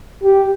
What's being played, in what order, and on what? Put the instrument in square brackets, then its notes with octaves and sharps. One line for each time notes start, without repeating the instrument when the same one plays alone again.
[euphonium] G4